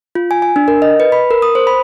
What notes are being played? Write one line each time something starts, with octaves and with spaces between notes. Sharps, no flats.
F4
G#5
G#5
D4
A#4
D#5
B4
B5
A#4
D#6
C5
B5